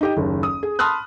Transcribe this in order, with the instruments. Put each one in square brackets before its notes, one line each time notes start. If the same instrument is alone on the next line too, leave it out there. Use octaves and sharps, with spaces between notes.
[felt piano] D#4 G4 D#5
F#1 D#2
D#6
G#4
A5 B5 C6 D#6 F6 F#6